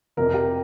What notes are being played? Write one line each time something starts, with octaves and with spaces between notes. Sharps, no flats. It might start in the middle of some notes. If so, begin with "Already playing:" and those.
F1 F2 C3 A#4
G4